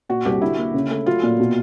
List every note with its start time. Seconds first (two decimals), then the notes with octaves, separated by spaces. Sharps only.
0.09 A#2 F#4
0.25 C2 G4
0.42 D3 E4
0.58 A#3
0.74 C#3
0.91 A3
1.06 F#3 F4
1.23 A#2
1.40 B2